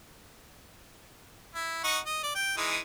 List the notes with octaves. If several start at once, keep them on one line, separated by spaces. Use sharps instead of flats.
E4
D#4 F#5 C#6
D#5
D5
G5
E3 G#3 D#4